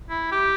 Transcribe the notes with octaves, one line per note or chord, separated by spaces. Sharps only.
E4
G4